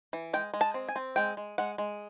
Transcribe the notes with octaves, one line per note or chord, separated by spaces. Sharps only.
E3
G#3 G5
G#3
A5
C4
G#5
C4
G#3 G5
G#3
G#3 F#5
G#3